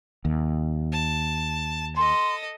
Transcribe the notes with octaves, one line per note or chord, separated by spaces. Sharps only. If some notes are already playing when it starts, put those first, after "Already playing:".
D#2
A5
A4 D#5 C6